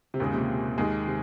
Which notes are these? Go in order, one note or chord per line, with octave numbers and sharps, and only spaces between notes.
C3
D#2 A#2 C#3 G#3
A#2
C3
D#2 D#3 G#3
C3